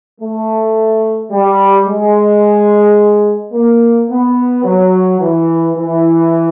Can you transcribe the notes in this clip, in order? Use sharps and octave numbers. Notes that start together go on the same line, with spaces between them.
A3
G3
G#3
A#3
B3
F#3
E3
E3